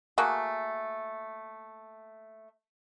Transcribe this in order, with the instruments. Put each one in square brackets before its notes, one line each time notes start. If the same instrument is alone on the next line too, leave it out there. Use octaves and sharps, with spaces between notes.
[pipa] A3 A#3 F#4 G#4